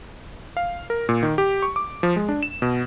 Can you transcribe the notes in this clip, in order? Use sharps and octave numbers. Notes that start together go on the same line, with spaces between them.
F5
A#4
A#2
D#3
G4
C#6
D6
F3
G#3
D4
E7
B2